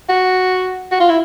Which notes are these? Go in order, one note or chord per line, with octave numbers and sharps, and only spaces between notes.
F#4
F#4
F4
E4